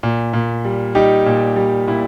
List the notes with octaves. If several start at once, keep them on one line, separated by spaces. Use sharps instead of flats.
A#2
A#2
G3
G3 D#4 G4
A#2
G3
A#2 E4